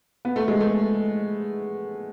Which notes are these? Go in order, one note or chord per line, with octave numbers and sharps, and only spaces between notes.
B3
A3
G#3
A3